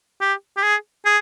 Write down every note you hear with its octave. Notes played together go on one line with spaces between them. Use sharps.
G4
G4
G#4
G#4